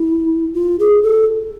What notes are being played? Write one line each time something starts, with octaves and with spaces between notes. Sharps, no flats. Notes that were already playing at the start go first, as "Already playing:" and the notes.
Already playing: E4
F4
G#4
A4